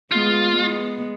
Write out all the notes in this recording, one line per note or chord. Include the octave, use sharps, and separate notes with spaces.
G#3 B3 F4
G#3 B3